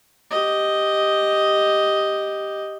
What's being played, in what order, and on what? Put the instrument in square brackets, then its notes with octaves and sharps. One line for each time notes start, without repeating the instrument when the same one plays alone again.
[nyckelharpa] G4 D#5